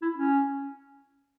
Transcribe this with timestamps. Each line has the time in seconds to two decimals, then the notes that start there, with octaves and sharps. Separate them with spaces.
0.02 E4
0.16 C#4